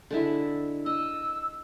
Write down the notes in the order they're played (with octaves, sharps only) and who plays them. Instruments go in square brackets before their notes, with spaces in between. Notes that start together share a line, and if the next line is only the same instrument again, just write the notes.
[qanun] D3 G#3 E4
[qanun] D#5 [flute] E6